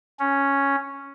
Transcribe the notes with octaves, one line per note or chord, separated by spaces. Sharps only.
C#4